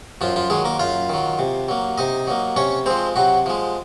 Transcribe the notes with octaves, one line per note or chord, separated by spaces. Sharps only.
F#2 F3 F4
F3 F4
D#3 F#3 G#3 G#4
A#3 A#4
F#2 F4 F5
D#3 F#3
C3
F#3 A#3
C3 D#4 D#5
F#3 A#3
C3 C#4 C#5
F3 G#3 C4 C5
C3 F#3 F#4
F3 G#3